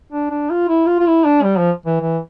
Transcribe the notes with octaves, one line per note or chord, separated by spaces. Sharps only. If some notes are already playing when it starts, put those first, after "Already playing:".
D4
D4
F4
E4
F4
F4
E4
D4
G3
F3
E3
E3